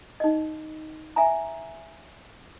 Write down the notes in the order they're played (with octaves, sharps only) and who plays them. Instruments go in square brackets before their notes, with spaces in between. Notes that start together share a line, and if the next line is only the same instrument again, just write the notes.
[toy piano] D#4 D#5
E5 G#5 A#5